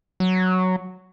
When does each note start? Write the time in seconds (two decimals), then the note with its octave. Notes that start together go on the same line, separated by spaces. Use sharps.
0.20 F#3